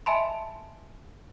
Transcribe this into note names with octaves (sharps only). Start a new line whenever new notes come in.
D#5 E5 G#5 A5 B5 C6